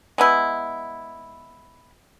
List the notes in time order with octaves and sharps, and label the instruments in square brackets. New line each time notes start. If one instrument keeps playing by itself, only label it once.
[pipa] G#3 B3 E4